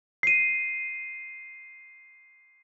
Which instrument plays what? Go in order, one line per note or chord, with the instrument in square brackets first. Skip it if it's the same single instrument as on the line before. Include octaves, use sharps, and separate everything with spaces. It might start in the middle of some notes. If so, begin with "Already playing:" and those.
[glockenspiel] C7 D#7